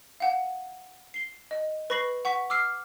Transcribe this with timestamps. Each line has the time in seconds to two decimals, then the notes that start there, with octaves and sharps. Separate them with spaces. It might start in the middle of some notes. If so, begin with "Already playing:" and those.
0.20 F5 F#5
1.14 C7 G7
1.51 D#5
1.90 B4 B5 C#6 A#6 C7 F#7
2.25 F#5 C#6 B6
2.50 D6 E6 F6 C7